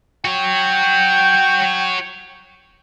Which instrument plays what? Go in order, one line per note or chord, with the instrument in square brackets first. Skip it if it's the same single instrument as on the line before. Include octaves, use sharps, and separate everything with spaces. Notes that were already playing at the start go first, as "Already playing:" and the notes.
[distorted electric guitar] F#4 C#5 [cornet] G5